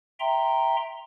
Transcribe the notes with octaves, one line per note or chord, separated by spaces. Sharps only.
E5 G5 A#5 C6